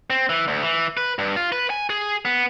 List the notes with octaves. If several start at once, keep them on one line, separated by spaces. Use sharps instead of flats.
C4
E3
D2
E3
B4
G2
F4
B4
G#5
G#4
B3